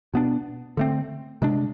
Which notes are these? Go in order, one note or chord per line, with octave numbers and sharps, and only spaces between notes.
B2 B3 D4
D3 A3 C4
C3 G#3 D4